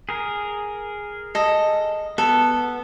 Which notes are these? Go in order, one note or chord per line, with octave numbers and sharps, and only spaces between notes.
G#4 A#4
A4 D#5
B3 A4